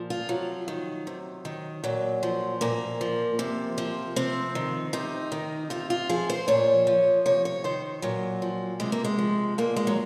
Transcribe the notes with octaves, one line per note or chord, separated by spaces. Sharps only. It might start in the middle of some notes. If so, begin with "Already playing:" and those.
Already playing: A#2 F3
F4
C3 F#3
D#3
C3
D#3
A#2 F#3
F3
A#2 A#3
F3
C3
F3
C3 C4
D#3
C3 D#4
D#3
C3 F4
F4
F3 G#4
C5
A#2 C#5
F3
C3 C#5
C#5
D#3 C5
A#2 F#3
F3
C3 G#3
A#3
G#3
F3
A#2 A#3
G#3
F#3